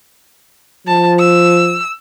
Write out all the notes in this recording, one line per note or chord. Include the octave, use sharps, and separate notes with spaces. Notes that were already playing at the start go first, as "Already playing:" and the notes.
F3 A5
E6